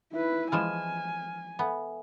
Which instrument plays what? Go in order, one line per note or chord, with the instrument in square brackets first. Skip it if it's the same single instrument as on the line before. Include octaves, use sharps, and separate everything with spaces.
[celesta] D#4 E5 [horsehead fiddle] E4 B4
[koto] E3 F3 G#3 [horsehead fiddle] G#5 [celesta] F6 E7
[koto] B3 [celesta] A4 E5 G#5